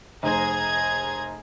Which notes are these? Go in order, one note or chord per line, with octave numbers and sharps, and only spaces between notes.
F1 G#4 C5 A#5 G#6